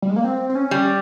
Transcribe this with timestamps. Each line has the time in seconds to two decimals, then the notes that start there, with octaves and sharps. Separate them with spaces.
0.02 G3
0.10 G#3
0.16 A#3
0.24 C4
0.49 C4
0.55 C#4
0.71 G3